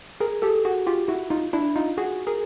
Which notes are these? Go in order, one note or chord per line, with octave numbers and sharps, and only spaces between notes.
G#4 A#4
G4 A4
F#4 G#4
F4 G4
E4 F#4
D#4 F4
D4 E4
D#4 F4
F#4 G#4
G#4 A#4